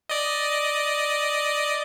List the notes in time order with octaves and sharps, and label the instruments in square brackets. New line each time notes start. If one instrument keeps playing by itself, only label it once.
[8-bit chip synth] D5 D#5